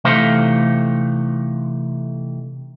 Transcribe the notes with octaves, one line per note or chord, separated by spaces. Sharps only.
C3 E3 A3 D#4 C5 F5